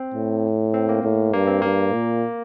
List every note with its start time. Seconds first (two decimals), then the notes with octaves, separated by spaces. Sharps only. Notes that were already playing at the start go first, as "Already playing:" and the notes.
Already playing: C4
0.14 A2
0.74 C4
0.89 A#3
1.03 A2
1.33 G2 A#3
1.47 C4
1.62 G2 A#3
1.93 A#2